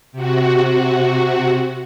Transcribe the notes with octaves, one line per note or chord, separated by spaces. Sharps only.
C3 F#4